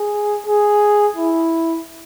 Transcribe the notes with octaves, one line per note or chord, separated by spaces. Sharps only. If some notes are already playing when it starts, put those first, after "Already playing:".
Already playing: G#4
G#4
E4